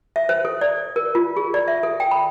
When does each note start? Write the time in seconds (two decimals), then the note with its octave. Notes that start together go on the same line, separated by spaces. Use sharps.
0.16 E5
0.29 C5
0.45 A4
0.61 D5
0.96 A#4
1.15 F4
1.37 G#4
1.54 D5
1.68 E5
1.83 A4
2.00 G5
2.11 B5